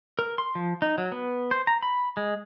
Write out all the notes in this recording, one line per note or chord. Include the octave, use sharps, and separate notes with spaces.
A#4
C6
F3
D#4
F#3
B3
C5
A#5
B5
G#3